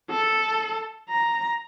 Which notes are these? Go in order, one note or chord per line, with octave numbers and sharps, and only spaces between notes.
A4
A#5